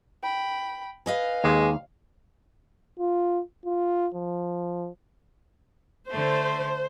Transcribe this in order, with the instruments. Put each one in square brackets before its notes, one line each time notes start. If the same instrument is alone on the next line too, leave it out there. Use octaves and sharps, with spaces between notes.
[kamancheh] G5 B5
[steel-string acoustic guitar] B4 D#5 G#5 [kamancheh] F5
[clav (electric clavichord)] D#2 [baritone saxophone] G#3
[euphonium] F4
F4
F3
[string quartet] D3 A3 [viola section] C5